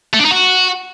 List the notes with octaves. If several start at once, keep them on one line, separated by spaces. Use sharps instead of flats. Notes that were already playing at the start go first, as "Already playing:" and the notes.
A3
D4
D#4
F#4